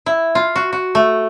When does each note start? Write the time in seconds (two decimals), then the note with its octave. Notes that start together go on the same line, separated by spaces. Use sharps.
0.06 E4
0.35 F4
0.56 F#4
0.73 F#4
0.95 A3